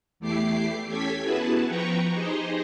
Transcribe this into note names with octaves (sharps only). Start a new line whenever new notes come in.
E2 A3 E4 G4 D6 C7
C#4 G4 A4 G#6 B6
B3 E4 F#4 G#4 B4 A5
F3 B4 G5 A#5 C#6
D#4 G4 G#4 C5 D#5